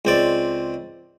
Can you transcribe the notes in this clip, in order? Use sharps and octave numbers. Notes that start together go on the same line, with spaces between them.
C#2 C4 D5